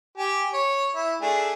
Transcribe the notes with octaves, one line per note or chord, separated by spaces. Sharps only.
G4 G#5
C#5
E4
A3 D4 G#4